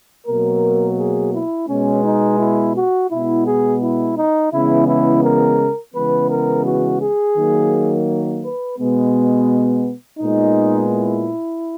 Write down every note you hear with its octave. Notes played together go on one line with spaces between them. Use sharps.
B2 F#3 A#3 A#4
G#4
E4
B2 G#3 B3 C#4
D#4
E4
F#4
B2 G#3 B3 E4
G#4
E4
D#4
C#3 E3 G#3 B3 E4
E4
A#4
C#3 E3 G#3 B3 B4
A#4
F#4
G#4
D#3 F#3 A#3
B4
B2 G#3 B3
A#2 G#3 B3 D#4
E4